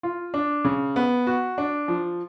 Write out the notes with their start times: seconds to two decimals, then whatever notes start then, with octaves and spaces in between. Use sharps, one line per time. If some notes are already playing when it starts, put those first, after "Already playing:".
0.03 F4
0.34 D4
0.64 C#3
0.96 B3
1.27 F#4
1.58 D4
1.88 F3